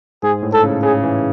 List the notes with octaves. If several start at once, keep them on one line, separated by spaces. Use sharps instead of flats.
G#2 G#4
A2
A4
C#3
C#3 G#4
E3